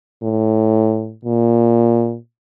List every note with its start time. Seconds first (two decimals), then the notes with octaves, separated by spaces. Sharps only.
0.23 A2
1.25 A#2